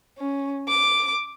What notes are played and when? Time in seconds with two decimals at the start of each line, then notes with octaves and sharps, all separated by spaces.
0.18 C#4
0.69 D6